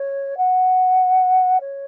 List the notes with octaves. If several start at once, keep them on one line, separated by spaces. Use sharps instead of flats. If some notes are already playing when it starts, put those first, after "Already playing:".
Already playing: C#5
F#5
C#5